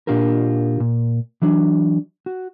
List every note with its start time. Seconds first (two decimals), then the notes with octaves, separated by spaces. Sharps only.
0.07 A#2 D4 F4 G4 A#4
0.80 A#2
1.42 E3 F#3 D4
2.26 F#4